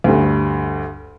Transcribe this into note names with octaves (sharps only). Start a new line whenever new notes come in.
D2 G2